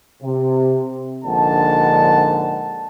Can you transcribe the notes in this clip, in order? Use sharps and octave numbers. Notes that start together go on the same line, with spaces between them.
C3
A#1 G#2 D3 D#5 F#5 A5